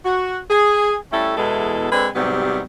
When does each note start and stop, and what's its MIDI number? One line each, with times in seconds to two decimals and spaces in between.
0.04 0.38 66
0.50 0.95 68
1.12 1.34 55
1.12 1.34 57
1.12 1.34 61
1.12 1.34 64
1.12 1.34 69
1.37 1.88 40
1.37 1.88 47
1.37 1.88 52
1.37 1.88 56
1.37 1.88 69
1.92 2.08 56
1.92 2.08 60
1.92 2.08 62
1.92 2.08 69
1.92 2.08 71
2.15 2.61 44
2.15 2.61 48
2.15 2.61 54
2.15 2.61 55
2.15 2.61 59